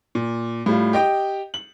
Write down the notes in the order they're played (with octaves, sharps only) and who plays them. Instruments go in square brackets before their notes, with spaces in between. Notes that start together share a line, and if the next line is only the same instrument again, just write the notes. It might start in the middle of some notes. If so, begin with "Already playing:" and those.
[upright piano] A#2
A2 G3 F4
G4 D#5 G5
F#7